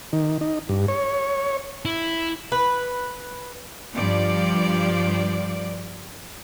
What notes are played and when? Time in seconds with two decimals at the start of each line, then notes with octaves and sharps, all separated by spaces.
0.13 D#3
0.41 D#4
0.69 G2
0.88 C#5
1.85 E4
2.52 B4
3.94 G2 F3 D5